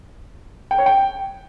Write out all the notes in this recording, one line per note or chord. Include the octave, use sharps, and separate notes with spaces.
G5
C#5
G5